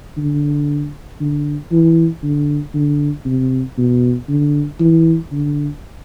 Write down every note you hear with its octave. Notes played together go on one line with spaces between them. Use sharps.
D3
D3
E3
D3
D3
C3
B2
D3
E3
D3